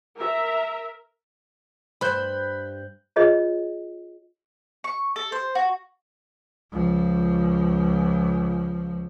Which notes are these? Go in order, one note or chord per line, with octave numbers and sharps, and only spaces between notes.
A#4 E5
G2 C5 B5 F#6 G6
F4 G#4 C#5 D#5
C#6
A4
C5
F#4
C#2 F3